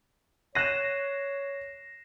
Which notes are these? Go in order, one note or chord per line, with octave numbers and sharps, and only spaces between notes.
C#5 F#6 A#6 C7 D#7 E7